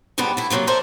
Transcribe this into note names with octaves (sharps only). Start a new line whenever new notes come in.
F2 G#2 D3 G3 B3
A3 E4
C3 F3 F#3 A#3 F4
A4 A#4 C5 D5 E5